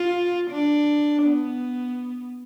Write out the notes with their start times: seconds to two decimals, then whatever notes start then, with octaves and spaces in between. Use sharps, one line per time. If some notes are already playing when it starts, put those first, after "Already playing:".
Already playing: F4
0.51 D4
1.24 B3